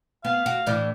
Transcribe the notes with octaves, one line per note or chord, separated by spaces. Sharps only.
B3 F5
F#4
A2 E3 D4